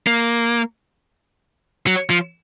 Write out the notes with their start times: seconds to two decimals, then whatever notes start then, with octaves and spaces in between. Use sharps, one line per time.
0.07 A#3
1.87 F#3
2.10 F3